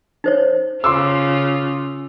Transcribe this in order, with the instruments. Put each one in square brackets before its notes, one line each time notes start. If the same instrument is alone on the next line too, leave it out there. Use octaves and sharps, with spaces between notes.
[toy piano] D#4 C5 C#5
[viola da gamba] C#3 F4 [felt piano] C6 D6 E6